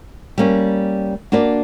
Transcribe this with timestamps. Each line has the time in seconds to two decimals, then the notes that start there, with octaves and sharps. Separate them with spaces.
0.38 G3 A#3 C#4
1.32 A#3 D4 F#4 B4 D5